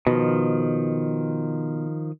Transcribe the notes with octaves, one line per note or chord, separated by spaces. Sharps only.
B2 D#3 F3